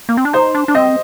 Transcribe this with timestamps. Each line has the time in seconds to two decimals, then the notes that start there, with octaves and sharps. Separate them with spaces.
0.09 A#3
0.17 C4
0.25 D4
0.33 D#4 C5
0.55 D4
0.68 D4
0.75 C4 D#5